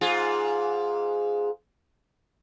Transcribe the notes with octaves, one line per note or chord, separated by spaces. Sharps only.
G#2 F4 G#4